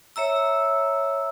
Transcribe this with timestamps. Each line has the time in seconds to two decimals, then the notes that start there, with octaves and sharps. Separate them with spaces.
0.16 C#5 E5 A#5 E6